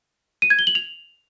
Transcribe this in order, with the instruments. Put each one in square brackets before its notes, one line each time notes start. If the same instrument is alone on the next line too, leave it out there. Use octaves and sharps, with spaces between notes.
[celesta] D#7
G#6
G7
F#7
F7